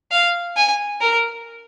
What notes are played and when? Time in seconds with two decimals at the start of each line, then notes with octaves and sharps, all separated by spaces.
0.12 F5
0.57 G#5
1.01 A#4